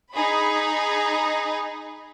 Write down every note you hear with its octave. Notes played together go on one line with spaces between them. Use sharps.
D#4 G#4 B5